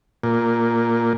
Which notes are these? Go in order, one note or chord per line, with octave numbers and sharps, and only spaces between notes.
A#2